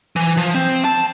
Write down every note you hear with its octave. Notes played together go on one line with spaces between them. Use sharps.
E3
F3
C4
A5